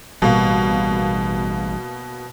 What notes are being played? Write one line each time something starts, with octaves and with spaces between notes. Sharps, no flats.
A1 B2 G3 A#3